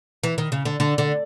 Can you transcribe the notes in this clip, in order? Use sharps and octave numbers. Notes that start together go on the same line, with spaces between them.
E3
D#3
C#3
D3
D3
D3